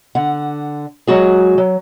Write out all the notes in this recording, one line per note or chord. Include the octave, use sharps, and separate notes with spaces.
D3 F#5
F#3 G#3 F#4 G#4
F#3